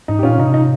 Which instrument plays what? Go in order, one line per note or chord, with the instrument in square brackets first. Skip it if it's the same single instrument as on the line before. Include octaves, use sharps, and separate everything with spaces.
[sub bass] G#2 [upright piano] D#4
[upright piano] G4
[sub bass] A#2 [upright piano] C#4 F4
[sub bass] C3 [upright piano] D#4
[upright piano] D#4